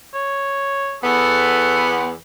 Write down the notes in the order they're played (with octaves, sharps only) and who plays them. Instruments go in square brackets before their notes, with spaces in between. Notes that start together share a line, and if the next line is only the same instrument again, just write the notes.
[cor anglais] C#5
[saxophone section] E2 B3 [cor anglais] A4